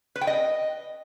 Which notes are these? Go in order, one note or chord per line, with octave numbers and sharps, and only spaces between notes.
B4
G5
D#5